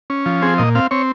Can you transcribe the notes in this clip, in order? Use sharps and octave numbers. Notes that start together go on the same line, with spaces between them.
C#4
F3
C4 G#4
A#2 D#5
C4 F5
C4 C#5